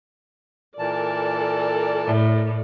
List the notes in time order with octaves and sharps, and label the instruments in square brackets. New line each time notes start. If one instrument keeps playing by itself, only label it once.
[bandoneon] A#2 E3 A5 [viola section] A4 A#4 D5
[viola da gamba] A2